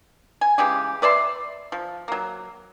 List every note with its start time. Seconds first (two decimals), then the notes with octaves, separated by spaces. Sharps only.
0.41 G#5
0.58 C#3 E3 G#3 G4
1.02 B4 D5 E5 C6
1.72 F3
2.08 F#3 A#3